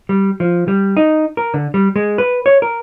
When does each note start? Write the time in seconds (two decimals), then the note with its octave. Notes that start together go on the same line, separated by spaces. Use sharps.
0.09 G3
0.40 F3
0.68 G3
0.97 D#4
1.37 A#4
1.54 D3
1.74 G3
1.96 G#3
2.18 B4
2.46 C#5
2.62 A#4